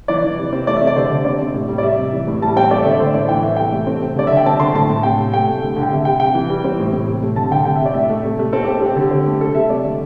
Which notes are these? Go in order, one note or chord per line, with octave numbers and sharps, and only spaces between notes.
E3 D5
E3
C3
C4
A3 D5
E5
C3
D5
D3 C5
D3
C4 D5
C3
A2
G3
D5
C3 E5
C3
E3
A2
G3 A5
C4 G5
A3 D5
D3 E5
D5
A3 C5
A2 D5
E3 G5
A3 E5
C3 G5
A3
C4
C3
D3 D5
E5
D3
G5
C4 A5
D3 C6
A2 A5
A2
C3 G5
C3
A3 G5
A2
D3
D3
G5
C3 E5
C3 G5
C3 G5
E3
G3
C4
A2
A2
C3
A3
D3 A5
D3 G5
C3 G5
C3 E5
D5
A2 E5
A3
C3
A3
C4 A4
C4 G4
C4 G4
D3
C4
A3
C3 A4
C3 E5
A3 D5
D3